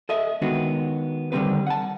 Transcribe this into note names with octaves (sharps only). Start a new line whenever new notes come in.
A4 D#5 E5
D#3 G#3 B3 D4 F#4
D3 D#3 G3 C4 D#4 B4
F#5 A5